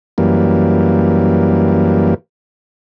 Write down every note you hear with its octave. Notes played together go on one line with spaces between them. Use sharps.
F#2 E3 G3 A#3